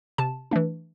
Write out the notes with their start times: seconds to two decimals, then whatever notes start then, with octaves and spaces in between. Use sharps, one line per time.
0.18 C3 A5
0.51 E3 A3 D4